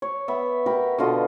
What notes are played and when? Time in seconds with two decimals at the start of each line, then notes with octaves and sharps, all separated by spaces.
0.02 C#5
0.28 B3 E5 B5
0.66 G4 A#4 F#5 B5
0.98 B2 D3 F4 D#5